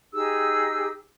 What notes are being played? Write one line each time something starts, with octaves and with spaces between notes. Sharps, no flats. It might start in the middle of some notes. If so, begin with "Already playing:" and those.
D#4 G4 G#4 E6